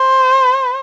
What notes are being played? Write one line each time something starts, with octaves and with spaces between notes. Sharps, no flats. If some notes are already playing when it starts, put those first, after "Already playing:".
Already playing: C5